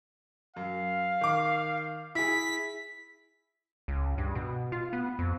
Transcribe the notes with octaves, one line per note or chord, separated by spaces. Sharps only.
F#2 F5
D#3 D6
E4 G#4 B6
C#2
G2
B2
F4
B3
F2